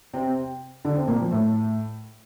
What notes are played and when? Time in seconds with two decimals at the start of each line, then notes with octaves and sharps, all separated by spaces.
0.13 C3 C4
0.85 D3 D4
0.96 C3 C4
1.08 A#2 A#3
1.20 F3
1.31 A2 A3